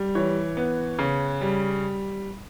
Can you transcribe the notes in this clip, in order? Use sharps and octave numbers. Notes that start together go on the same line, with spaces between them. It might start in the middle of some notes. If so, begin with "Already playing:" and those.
Already playing: G3
E3 C#5
B3
C#3
G3